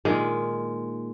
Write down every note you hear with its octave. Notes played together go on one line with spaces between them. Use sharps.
A#2 D#3 G#3